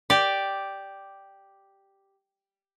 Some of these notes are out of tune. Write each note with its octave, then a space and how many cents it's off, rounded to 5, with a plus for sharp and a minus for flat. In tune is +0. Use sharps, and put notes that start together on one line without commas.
G4 +0 D5 +0